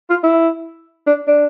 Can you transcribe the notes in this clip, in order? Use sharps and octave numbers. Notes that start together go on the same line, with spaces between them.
F4
E4
D4
D4